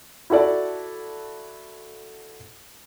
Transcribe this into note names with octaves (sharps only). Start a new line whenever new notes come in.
E4 F#4 A4 D5